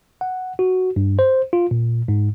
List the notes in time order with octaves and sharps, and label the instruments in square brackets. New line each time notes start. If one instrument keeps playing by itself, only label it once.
[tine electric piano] F#5
F#4
G2
C5
F4
A#2
G#2